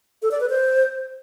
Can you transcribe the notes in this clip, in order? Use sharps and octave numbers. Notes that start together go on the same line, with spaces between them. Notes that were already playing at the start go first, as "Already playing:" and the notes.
A4
D5
B4
C5